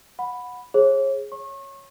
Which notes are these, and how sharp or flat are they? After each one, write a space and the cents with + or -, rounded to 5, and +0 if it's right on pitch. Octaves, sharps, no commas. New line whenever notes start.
F#5 -20 B5 +0
G#4 +0 C#5 -40
C#5 -5 C#6 -30